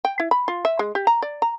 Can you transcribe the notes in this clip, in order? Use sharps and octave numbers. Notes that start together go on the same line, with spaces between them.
G5
E4
B5
F4
E5
G#3
G4
A#5
D5
A#5